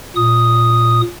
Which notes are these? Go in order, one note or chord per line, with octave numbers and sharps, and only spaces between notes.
A#2 D#6